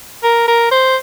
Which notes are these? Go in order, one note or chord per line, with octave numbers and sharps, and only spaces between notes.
A#4
A#4
C5